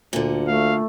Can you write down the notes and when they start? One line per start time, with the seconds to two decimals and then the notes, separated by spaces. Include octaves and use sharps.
0.13 D2 A#2 D3
0.48 A3 F5